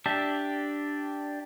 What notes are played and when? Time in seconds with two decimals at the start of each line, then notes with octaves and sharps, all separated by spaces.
0.06 D4 G4 E5